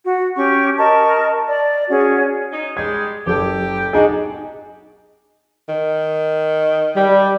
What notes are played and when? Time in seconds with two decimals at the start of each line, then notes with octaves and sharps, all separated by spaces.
0.03 F#4
0.36 C#4 G4 C#6
0.77 A#4 D#5 A5 C#6
1.47 D5
1.88 C#4 F#4 G#4
2.51 C#4 D#4
2.77 G3 G#3 G#6
3.26 F#1 G4 A4
3.93 D4 D#4 F#4 G#4
5.69 D#3
6.97 G3